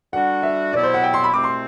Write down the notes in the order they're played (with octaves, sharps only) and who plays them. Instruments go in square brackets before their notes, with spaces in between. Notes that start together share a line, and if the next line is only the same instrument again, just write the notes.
[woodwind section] D3 G3 D4 F#4 [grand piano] F#5
[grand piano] E5
[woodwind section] C2 B2 F#3 B3 E4 [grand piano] D5
[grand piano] C5
F#5
G5
C6
B5
[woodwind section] C2 B2 A3 C4 [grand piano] D6
[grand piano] C6